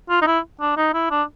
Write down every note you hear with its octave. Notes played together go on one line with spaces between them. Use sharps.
F4
D#4
E4
D4
D#4
E4
D4